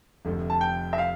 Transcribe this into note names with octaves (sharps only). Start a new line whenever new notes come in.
F1 F2 D3 A3
A5
G5
E5
F5